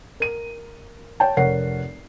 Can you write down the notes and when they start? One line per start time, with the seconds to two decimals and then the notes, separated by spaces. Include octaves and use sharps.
0.20 A#4 D#7
1.20 C#5 G5 A5
1.37 F1 A#4 C#5 F#5 C7